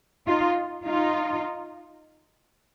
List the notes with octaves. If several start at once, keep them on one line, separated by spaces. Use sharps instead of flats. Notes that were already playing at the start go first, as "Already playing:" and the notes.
D#4 F4
D#4 F4